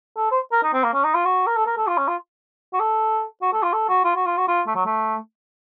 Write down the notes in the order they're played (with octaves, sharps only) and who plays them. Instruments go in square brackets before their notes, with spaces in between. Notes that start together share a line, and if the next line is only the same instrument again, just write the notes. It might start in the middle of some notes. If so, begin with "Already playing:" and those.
[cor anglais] A4
C5
A#4
D#4
C4
A#3
C#4
D#4
F4
F#4
A#4
A4
A#4
A4
F4
C#4
F4
F#4
A4
F#4
A4
F4
A4
F#4
F4
F#4
F4
F#4
F4
A3
F#3
A3